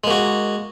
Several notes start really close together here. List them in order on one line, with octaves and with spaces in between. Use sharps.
G#3 A#3 F#4